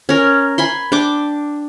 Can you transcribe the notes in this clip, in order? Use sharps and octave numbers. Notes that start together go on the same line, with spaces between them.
C#4 A#4
G#5 B5 C6
D4 G5 D6